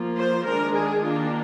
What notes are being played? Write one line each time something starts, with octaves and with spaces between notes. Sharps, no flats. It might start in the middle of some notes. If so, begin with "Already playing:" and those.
Already playing: F3 A#3 F4
C5
D#3 G#3 D4 A#4
G#4
D#3 A#3 D4 F4